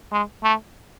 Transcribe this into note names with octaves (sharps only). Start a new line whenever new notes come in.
G#3
A3